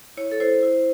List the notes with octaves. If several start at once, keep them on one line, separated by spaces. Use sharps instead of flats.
E4 C#5
A4
E4 C5
E4